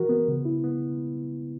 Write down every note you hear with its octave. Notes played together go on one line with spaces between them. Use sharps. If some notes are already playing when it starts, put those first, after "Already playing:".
Already playing: E3 F#4 A#4
B3
C#3
E4
B3